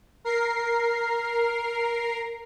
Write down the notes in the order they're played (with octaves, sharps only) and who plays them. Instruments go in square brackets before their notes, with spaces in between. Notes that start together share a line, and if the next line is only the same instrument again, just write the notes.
[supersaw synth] A#4 C7